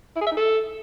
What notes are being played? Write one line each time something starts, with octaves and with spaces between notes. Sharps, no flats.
E4
G#4
E5
D#4
A4